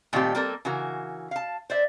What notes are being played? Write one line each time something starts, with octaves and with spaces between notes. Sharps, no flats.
A#2 D#3 G3 A3 C4 G4
G3 A#3 C4 A4 A#4
C#3 E3 F#4 A#4
F5 A5
C5 D5 E5